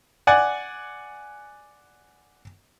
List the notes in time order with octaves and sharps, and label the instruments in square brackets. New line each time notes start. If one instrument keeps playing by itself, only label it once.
[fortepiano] D5 F#5 G#5